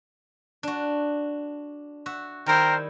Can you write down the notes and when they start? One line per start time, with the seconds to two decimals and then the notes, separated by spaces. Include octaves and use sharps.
0.63 D4 F#4
2.06 F#4 E5
2.46 D#3 G3 E4 A#4 C5 G5